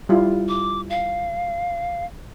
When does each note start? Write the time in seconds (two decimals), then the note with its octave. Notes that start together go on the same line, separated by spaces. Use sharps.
0.09 G3 E4 F4
0.48 D6
0.90 F5